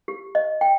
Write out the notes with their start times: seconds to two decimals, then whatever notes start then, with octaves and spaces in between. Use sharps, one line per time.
0.08 G4
0.35 D#5
0.61 G5